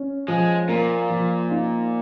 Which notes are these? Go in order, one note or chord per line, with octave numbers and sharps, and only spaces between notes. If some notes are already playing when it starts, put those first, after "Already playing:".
Already playing: C#4
F3 G#3
A#2 A#3
F3
D#4